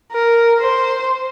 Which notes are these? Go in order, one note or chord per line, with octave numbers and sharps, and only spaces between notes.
A#4
C5